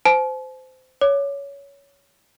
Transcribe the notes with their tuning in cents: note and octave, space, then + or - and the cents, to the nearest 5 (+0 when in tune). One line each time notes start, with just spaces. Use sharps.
C5 -20 A5 -45
C#5 +15 D6 +20